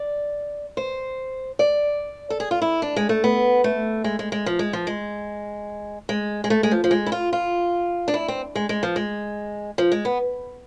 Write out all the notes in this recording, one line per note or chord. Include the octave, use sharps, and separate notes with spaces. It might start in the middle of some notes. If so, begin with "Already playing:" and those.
Already playing: D5
C5
D5
A4
G#4
F4
E4
D4
G#3
A3
B3
A3
G#3
G#3
G#3
F3
G#3
F3
G#3
G#3
G#3
A3
G#3
F3
F3
G#3
E4
F4
F4
D4
E4
C4
G#3
G#3
F3
G#3
F3
G#3
B3